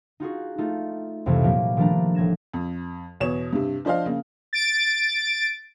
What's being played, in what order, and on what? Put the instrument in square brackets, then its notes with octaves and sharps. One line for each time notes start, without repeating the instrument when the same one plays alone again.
[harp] D#4 F4 F#4 G#4
A3 D#4 F4
C2 F2 C3 E3 G#3 A3
A#2 F3 F#3 A#3 G4
D#3 F3 G3 A3 D4 A#5
A1 G#6 A#6 E7
[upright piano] F2
E2 B2 C#5 E7
G2 C3
F3 D4 C5 D#5 F5
C#3 A#3
[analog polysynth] A6 D7